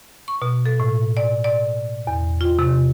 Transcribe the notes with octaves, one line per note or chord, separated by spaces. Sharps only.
C#6
B2
A4
A2
D5
D5
E2
F4
C3